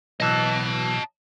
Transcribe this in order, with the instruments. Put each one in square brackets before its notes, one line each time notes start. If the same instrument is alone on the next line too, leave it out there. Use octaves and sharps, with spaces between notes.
[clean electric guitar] B1 E3 [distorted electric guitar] D#5 A5